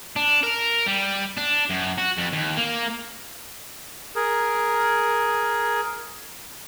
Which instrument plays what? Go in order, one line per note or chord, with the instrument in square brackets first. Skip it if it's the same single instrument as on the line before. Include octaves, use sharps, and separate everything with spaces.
[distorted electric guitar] D4
A#4
G3
D4
F#2
F#4
F2
D#2
A#3
[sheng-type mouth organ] G#4 A#4